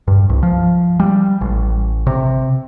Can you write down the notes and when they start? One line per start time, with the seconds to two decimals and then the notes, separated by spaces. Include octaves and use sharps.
0.08 G2
0.29 C2
0.43 F3
1.00 G3
1.41 A1
2.07 C3